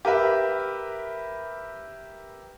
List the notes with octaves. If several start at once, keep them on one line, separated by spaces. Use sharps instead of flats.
G4 A#4 B4 E5